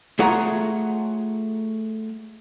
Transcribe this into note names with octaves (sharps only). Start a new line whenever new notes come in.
A3 F4 G#4 C#5 F#5 A#5